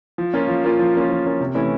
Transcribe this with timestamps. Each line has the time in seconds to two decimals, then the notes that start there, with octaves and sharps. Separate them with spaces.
0.18 F3
0.34 A#3 C#4 F4
0.48 F3
0.64 A#3 C#4 F4
0.79 F3
0.94 A#3 C#4 F4
1.09 F3
1.25 A#3 C#4 F4
1.40 C3
1.55 E3 A3 C#4 E4